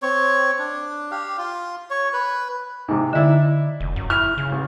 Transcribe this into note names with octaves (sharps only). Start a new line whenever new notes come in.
C4 C#5
D4
G4 F5
F4
C#5
B4
G#2 C3
D3 D#4 E4 D5
F1
F#2
E4 F6
C#3
A1